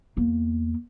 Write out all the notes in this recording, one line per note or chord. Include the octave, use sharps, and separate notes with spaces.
E2 A#3